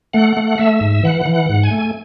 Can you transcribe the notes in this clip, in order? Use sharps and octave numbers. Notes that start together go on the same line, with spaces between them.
A3 F#5
A3
A3 E5
G#2
E3 F#5
E3
F#5
G#2
G#5
A3